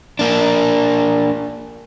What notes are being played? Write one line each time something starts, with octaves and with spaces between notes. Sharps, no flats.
A#3 D4